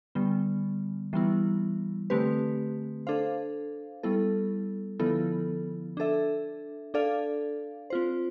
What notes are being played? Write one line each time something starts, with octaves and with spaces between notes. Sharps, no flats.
D3 G3 B3
E3 G3 B3 E4
D3 A3 C4 G4 B4
D4 A4 C5 F5
G3 B3 E4 A4
D3 F3 B3 E4 A4
D4 A4 E5
D4 A4 D5 F5
C4 F4 C5